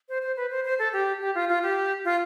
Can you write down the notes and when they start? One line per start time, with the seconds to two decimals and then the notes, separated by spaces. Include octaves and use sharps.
0.09 C5
0.22 C5
0.37 B4
0.51 C5
0.65 C5
0.79 A4
0.93 G4
1.21 G4
1.35 F4
1.49 F4
1.63 G4
2.05 F4